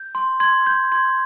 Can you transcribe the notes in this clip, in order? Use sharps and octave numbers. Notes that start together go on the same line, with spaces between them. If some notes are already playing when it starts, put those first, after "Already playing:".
Already playing: G6
C6
C6 G#6
G6
C6 G#6